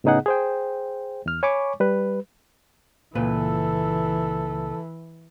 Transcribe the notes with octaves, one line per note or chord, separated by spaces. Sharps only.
A2 C#3 B3 D#4 G#4 F#5
G#4 C5 G5
E2 F6
C#5 G#5 B5 C#6 D6
G3 B4
C#2 A#2 E3 A4 B4